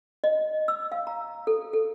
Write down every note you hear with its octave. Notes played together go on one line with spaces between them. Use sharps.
D#5
E6
F5
A#5
A4
A4